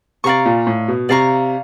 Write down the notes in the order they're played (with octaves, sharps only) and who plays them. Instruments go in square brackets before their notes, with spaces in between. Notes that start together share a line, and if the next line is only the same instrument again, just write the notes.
[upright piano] C3 [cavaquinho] D5 F5 A#5 C#6
[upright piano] A#2
A2
B2
[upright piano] C3 [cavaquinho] D5 F5 A#5 C#6